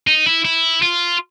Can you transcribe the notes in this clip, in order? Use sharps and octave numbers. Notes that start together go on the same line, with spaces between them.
D#4
E4
E4
F4